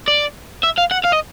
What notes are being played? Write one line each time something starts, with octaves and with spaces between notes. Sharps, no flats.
D5
E5
F5
F#5
F5
D#5